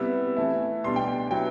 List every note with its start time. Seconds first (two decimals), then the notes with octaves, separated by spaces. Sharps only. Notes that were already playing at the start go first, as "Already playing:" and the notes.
Already playing: C3 G3 B3 E4 E6
0.36 E3 A3 E4
0.84 B2 G3 D4 C6
0.96 G5
1.08 G5
1.31 F#3 B3 E4 G5